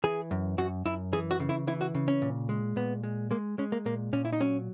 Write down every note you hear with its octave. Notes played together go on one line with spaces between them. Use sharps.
E3 G#4
F#2
F#2 F#4
F#2 E4
E3 G#4
F#4
C#3
E4
E3 E4
F#4
C#3
C#4
A#2
G#3
A#2 B3
G#3
G#3 A#3
G#3 C#4
A#3
A#2 A#3
A#2 C#4
E4
D#4
F#3 C#4